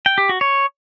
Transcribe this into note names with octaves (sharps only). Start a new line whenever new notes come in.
G5
G4
F#4
C#5